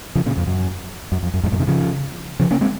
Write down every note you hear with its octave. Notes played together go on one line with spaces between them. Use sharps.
C#3 F3
A#2 C#3
F2
F#2
F#2
F2
F#2
F2 G#2
F#2 A#2
C3 D#3
C#3 F3
C#3 F3
A#3 C#4
G#3 C4